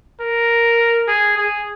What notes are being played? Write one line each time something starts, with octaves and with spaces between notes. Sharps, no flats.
A#4
G#4
G#4